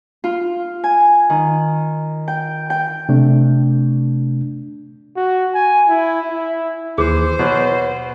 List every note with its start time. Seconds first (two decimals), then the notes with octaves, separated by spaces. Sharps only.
0.24 F4
0.84 G#5
1.30 D#3
2.28 G5
2.70 G5
3.09 C3 A3 D4
5.17 F#4
5.54 G#5
5.89 E4
6.30 E4
6.98 D#2 E3 G#4 C5
7.39 B2 B4 C#5